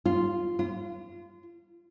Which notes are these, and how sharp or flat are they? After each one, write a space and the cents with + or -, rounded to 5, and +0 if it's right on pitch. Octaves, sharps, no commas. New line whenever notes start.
F4 -5
F4 -30